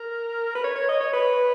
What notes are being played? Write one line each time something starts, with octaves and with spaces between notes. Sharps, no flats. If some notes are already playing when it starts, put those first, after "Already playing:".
Already playing: A#4
B4
C#5
C#5
D#5
C#5
B4